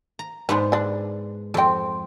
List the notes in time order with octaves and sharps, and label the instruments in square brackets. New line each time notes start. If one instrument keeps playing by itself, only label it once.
[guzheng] A#5
[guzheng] G#2 G#3 B3 [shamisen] D4 B4
[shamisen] D3 D4
[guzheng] F2 C4 [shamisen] A4 G5